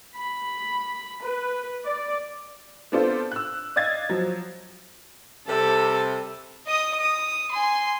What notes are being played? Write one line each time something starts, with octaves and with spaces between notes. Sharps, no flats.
B5
B4
D5
B3 C4 D4 F4 A4 C5
E6 F#6
D5 D#5 F5 G#6 A6
F3 F#3
C3 G3 A4
D#5 D#6
D#6
G#5 C6